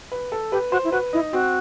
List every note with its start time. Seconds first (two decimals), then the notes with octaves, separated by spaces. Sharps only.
0.12 B4
0.32 A4
0.52 G4 B4
0.72 F#4 C5
0.84 E4
0.92 F#4 B4
1.13 D#4 E4
1.33 C4 F#4